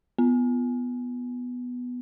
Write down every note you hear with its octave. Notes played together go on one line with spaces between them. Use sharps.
B3